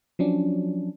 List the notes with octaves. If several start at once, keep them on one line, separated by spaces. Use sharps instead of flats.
F3 F#3 C#4 D4